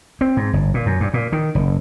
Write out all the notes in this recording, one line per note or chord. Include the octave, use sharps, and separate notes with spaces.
C4
G#2
G1
A#2
F#2
G2
A#2
D#3
F#1